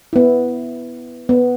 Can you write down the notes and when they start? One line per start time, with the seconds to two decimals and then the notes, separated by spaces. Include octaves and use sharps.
0.13 B3 E4
1.29 B3